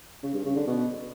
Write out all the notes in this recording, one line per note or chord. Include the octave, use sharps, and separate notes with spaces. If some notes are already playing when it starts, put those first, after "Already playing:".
C#3
G2
C#3
D3
B2